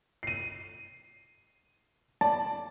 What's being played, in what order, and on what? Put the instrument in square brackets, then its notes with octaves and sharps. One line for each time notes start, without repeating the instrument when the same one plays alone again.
[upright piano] C7 D#7
[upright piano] D5 [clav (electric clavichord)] A5